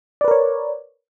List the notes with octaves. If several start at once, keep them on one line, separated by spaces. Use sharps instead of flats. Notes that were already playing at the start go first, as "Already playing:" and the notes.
A#4 B4 C#5 D5